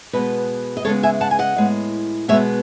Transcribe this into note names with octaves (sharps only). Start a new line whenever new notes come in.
B2 G#3 B3 B4 D#5
D#5
C#3 G#3 B3 A4 C#5
E5 G#5
F#5 A5
G#5
D#5 F#5
A2 G#3 B3
B2 G#3 B3 C#5 E5